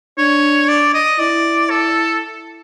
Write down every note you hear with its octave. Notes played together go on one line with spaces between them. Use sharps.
D4 C#5
D5
D#5
E4 D5
A4